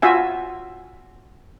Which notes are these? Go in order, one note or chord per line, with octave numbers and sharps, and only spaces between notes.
F4 F#4 E5 G#5